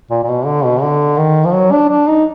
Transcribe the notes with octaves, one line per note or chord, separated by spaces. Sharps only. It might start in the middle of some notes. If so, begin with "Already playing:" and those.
A#2
A#2
B2
D3
B2
D3
D#3
F3
F#3
D4
D4
D#4